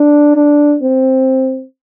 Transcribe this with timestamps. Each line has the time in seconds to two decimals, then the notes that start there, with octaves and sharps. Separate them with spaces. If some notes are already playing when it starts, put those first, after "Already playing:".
Already playing: D4
0.36 D4
0.82 C4